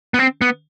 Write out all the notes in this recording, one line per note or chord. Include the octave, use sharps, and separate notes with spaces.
B3
C4
B3